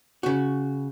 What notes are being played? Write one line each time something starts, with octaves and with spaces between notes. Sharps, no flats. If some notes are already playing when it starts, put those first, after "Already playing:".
C#3 F#4